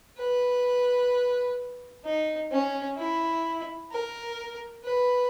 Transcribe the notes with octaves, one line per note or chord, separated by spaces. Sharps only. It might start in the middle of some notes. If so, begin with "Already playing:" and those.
B4
D#4
C#4
E4
A#4
B4